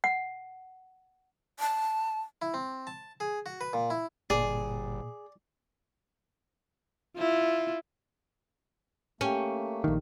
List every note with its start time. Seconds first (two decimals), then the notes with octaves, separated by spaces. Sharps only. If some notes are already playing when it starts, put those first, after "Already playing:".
0.04 F#5
1.60 A5
2.42 E4
2.54 C4
2.87 A5
3.20 G#4
3.46 F#4
3.61 B4
3.73 A#2
3.90 E4
4.30 G1 A#2 G#4 D5
7.17 E4 F4
9.21 A3 A#3 C#4 G4 G5
9.84 A#1 D#3